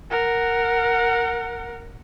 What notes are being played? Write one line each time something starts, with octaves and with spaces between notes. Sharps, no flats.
A#4 F#5